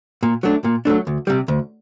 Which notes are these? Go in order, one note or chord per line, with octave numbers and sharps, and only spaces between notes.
A#2
F#3 A3 D4
A#2
F#3 A3 D4
D2
C3 G3
D2